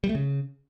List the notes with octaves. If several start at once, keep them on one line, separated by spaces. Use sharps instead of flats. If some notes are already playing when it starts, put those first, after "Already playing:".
G3
A3
C#3